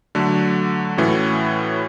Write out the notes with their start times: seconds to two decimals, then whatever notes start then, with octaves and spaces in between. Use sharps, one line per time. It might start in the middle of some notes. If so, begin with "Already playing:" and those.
0.15 D3 F#3 A3
0.97 A2 E3 A3 C#4 F#4